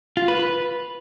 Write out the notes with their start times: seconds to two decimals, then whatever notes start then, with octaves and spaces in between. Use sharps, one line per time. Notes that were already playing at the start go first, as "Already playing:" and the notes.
0.17 F4
0.28 B4
0.39 B4